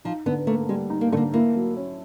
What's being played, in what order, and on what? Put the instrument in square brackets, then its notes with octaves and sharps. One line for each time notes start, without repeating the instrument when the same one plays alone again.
[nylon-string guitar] F3 [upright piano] D#4
[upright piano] D3 [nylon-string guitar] B3
[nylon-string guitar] A3 [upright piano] A#3
[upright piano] G3 [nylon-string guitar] G#3
[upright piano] D#4
[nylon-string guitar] A#3
[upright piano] D3 [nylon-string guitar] A3
[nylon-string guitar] A#3
[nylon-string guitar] A#3 [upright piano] E4
[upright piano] F#3
C#4